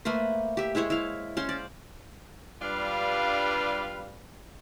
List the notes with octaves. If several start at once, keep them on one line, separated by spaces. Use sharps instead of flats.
A3 A#3 B4 C5
G4 E5
G#3 E4 C5 C#5
E4 F5
C#4 C5 F5 C6
D5
G2 G3 D4 F4 B4 F5